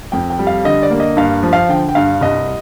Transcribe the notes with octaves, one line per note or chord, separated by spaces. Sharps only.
F2 G5
G5
G3
F5
D3 D#5
D5
A#3
D#5
G2 F5
F3
F5
D3 G5
G5
G2 F5
C2 D#5